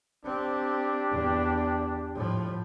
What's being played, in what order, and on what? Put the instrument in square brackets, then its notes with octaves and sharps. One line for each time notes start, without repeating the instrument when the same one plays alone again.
[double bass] C4 [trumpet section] D4 G4
[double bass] E2
A2 F3